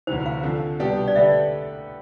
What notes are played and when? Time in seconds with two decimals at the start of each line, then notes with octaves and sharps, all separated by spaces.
0.07 D2 C3 E3 C5
0.26 F5
0.43 D3 F3 C4
0.79 C2 B2 B3 D4 G4
1.08 D5
1.16 D3 A3 D4 G4 B4 E5